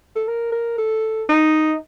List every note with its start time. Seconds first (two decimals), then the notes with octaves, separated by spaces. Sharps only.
0.16 A4
0.28 A#4
0.52 A#4
0.78 A4
1.29 D#4